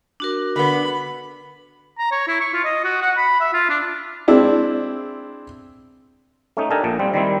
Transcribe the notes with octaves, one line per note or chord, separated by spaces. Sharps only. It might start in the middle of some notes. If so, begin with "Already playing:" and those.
D4 F#4 A#4
D3 B3 B5
A#5
C#5
E4
C#6
F4
D#5
F#4
F#5
B5
E5
F4
D4
G#3 C4 D4 E4
A3 C#4 D#4
D4 D#4 G4 A4 A#4 G#5
A#1 A#2
G3 C4
D#3 G3 C4 E4